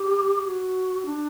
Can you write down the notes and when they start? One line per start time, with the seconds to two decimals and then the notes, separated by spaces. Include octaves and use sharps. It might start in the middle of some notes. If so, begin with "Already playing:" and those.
Already playing: G4
0.46 F#4
1.05 D4